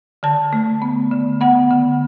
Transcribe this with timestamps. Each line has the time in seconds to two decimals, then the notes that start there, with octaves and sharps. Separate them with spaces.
0.23 D3 A5
0.53 A3
0.82 B3
1.11 D3
1.41 B3 F#5
1.71 D3